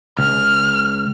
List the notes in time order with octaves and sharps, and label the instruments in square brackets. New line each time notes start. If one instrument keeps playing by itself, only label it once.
[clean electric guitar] C#2 [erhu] F6